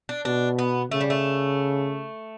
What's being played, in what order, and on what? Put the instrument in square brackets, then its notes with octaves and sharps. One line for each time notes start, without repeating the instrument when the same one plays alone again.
[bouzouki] D4
[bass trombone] B2 [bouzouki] D4
[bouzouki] B3
[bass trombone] C#3 [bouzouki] A3
[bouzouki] G3
A3